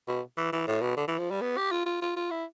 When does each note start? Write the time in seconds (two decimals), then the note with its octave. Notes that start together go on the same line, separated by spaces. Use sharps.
0.08 B2
0.37 E3
0.53 E3
0.67 A2
0.81 B2
0.97 D3
1.08 E3
1.19 F3
1.31 G3
1.41 B3
1.57 G4
1.72 F4
1.86 F4
2.02 F4
2.16 F4
2.31 E4